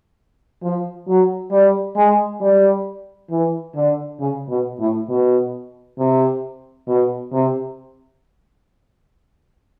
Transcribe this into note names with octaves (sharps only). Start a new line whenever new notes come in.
F3
F#3
G3
G#3
G3
E3
D3
C#3
B2
A2
B2
C3
B2
C3